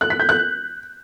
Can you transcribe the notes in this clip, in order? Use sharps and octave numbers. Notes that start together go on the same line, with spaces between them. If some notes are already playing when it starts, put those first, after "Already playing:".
F#6
B6
G6
F#6